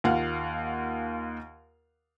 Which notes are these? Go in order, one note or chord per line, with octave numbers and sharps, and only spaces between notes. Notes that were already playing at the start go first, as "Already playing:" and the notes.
D#2 F4 F5 F#5